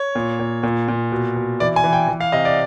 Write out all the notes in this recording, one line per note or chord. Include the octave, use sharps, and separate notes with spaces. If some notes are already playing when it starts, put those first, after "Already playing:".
Already playing: C#5
A#2
A#2
A#2
A#2
B2
B2
E3 D5
G#5
E3
G5
E3
F5
C3 D#5
D5